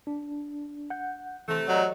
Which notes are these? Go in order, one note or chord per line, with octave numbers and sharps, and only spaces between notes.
D4
F#5 G6
C3 E3 A3
F#3 D5 D#5 A#5